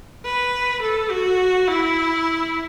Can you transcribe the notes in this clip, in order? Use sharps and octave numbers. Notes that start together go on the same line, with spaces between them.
B4
A4
F#4
E4